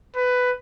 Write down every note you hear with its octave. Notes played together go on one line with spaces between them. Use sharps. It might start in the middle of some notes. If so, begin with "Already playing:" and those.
B4